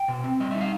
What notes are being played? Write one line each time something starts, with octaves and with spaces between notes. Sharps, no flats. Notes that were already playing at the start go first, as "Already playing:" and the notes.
Already playing: G5
B2
C4
G3 D#5
D#4 E5
F5